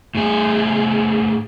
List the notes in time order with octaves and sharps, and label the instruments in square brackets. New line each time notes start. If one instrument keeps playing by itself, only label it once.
[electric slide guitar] A2 G#4